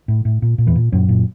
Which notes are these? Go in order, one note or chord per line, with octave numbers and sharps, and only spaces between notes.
A2
A2
A#2
A#2
E2 E3
A#2
F#2 A#2 F#3
A#2